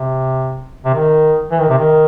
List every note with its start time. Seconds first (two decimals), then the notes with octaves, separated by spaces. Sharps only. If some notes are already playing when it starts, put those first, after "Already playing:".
Already playing: C3
0.85 C3
0.94 D#3
1.51 E3
1.60 D#3
1.69 C3
1.77 D#3